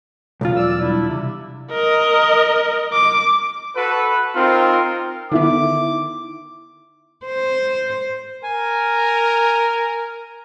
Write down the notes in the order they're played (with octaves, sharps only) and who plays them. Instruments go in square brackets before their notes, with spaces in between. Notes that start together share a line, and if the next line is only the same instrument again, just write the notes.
[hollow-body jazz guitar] B1 E2 F4
[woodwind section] D5 E6
G3 D4 E4
C3
[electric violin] A#4 D#5
D6
[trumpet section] F#4 A4 B4
C4 D#4 F4 A#4 G5
[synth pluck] D3 B3 [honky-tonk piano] D#3 E4 [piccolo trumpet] D6
[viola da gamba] C5
[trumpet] A#4 [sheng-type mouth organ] G#5